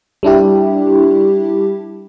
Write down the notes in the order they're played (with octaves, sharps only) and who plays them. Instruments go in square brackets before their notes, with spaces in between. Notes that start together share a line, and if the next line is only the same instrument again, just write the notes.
[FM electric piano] G3 D4 E4 G4